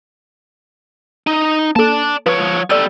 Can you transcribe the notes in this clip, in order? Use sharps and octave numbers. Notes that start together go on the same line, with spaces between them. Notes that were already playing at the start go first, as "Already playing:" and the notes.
D#4
A#3 A4 D5 A5
F3 B4 C#5
G3 A4 D5 D#7